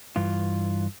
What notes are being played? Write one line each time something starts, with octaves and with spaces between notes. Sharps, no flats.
G2 E3 F4